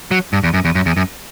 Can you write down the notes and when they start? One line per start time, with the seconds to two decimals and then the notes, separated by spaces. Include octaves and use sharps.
0.11 F#3
0.33 G2
0.43 E2
0.54 F#2
0.65 E2
0.75 F#2
0.86 E2
0.97 F#2